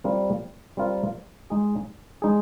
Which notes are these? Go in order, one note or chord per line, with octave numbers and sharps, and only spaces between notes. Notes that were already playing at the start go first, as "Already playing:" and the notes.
G3 C4 F4 A#4
G3 C4 F4 A#4
G#3 D#4 G#4
G#3 D#4 G#4